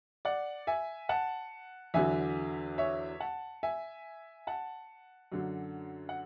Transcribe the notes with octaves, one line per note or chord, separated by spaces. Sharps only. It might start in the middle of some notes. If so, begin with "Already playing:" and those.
D5 F#5
E5 G#5
F#5 A5
E2 D3 F#3 E5 G#5
C#5 E5
F#5 A5
E5 G#5
F#5 A5
F#2 D3 F#3
F#5